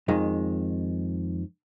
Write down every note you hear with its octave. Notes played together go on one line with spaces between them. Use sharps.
F2 D#3 G#3